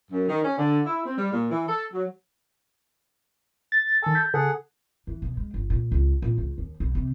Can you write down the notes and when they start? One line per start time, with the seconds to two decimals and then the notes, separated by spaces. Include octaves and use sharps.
0.11 F#2
0.28 D#3
0.44 C#4
0.58 D3
0.86 E4
1.06 C4
1.17 G3
1.33 A#2
1.51 E3
1.67 A4
1.93 F#3
3.72 A6
4.03 D#3 A4 G#5
4.15 G6 B6
4.34 C#3 G#4 A4 F#5
5.07 E3
5.22 B2
5.37 G#3
5.54 G1
5.70 A#2
5.92 C#2
6.22 A#2
6.38 C#2
6.58 D#2
6.80 B1
6.95 C3